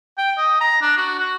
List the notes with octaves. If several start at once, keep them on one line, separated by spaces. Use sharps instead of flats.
G5
D#5
A#5
D4
F#4
F#4